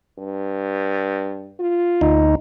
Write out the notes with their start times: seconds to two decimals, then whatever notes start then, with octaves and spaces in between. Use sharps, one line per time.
0.19 G2
1.60 F4
2.01 D2 D#4